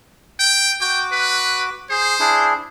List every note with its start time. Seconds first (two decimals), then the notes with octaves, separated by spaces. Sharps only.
0.40 G5
0.81 F#4 G5 D6
1.12 B4
1.90 G#4 C5
2.20 D4 E4 G#4